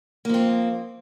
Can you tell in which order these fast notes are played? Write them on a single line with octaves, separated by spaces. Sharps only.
A#3 F3 C4